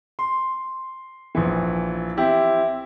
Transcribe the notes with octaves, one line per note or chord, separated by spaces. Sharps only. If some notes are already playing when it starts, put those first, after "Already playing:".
C6
A#1 E3
C4 E4 G4